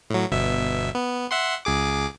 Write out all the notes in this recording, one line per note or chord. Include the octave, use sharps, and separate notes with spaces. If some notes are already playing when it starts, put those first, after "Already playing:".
A2 F#3
G1 B2 E5
B3
E5 F#5 C6
C#2 G#4 D6